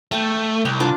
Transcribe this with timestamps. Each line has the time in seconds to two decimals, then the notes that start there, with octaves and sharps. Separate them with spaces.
0.12 A3 G5 A5
0.65 C2 G5
0.80 D4 F4 D6